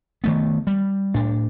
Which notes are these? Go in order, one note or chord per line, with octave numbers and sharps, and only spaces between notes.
D#3 A3 B3
G3
A2 D4